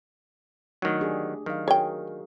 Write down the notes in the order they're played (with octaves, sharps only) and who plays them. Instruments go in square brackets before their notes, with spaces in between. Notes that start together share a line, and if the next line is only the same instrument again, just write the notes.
[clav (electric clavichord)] D#3 F#3 [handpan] A3 D4
[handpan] D4 G4 G#4
[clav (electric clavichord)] D#3 [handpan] F#3 F5
[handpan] F#4 G#4 A#4 [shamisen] C#5 G5